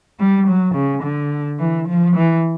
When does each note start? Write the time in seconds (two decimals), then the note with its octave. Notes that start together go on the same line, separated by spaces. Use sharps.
0.20 G3
0.48 F#3
0.75 C#3
1.03 D3
1.60 E3
1.88 F3
2.16 E3